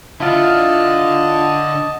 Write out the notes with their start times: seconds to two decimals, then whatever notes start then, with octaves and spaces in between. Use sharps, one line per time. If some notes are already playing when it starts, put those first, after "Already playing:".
0.20 D3 E4 F4 D#5 A5